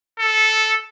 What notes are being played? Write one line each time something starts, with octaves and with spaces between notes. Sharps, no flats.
A4